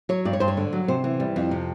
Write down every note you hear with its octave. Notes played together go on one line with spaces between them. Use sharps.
F#3 C#5
G2 D5
C#5
G2 C5
C#5
D3
F#3
C3 C5
E3
G3
F2
C3